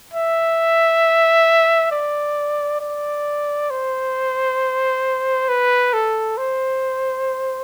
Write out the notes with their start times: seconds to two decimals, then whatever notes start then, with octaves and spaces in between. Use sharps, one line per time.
0.14 E5
1.91 D5
2.81 D5
3.70 C5
5.49 B4
5.94 A4
6.38 C5